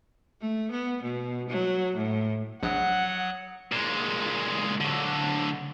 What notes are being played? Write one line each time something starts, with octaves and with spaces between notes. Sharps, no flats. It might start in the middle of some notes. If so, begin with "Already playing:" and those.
A3
B3
B2
F#3
A2
A#1 F#3 F#5 D#6 F#6
A#2 G#3
D3 F#3